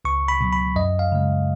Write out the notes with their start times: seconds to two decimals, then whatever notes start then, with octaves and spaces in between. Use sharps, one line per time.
0.05 C#2 C#6
0.28 B5
0.41 B2 F#3
0.53 B5
0.76 F#2 D#5
0.99 F5
1.12 C#3 G#3